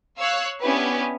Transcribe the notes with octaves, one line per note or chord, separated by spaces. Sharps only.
C#5 F5 E6 F#6
B3 C#4 D4 E4 G4 B4